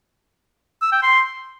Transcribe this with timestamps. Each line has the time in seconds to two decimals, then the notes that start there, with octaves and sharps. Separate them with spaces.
0.81 E6
0.92 G5
1.03 C6